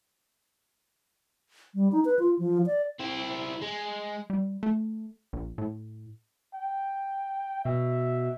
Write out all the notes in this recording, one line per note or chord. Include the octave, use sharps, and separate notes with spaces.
G3
D#4
B4
F4
F3
D5
C4 E4
G#3
G3
A3
A#1
A2
G5
B2 E5